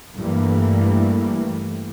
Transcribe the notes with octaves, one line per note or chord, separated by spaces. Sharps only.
G2 E3 G3 A3 A#3